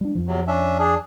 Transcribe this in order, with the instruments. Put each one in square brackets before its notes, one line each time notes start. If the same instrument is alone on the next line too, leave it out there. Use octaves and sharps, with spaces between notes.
[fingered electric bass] G3 D4
F2 F3
[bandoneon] E2 C3 F#3
C#4 D4 E5
D4 G#4